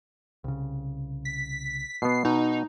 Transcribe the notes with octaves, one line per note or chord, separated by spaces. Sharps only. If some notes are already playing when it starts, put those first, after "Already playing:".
C2 C#3
B6
B2 B3 C7
B2 D#4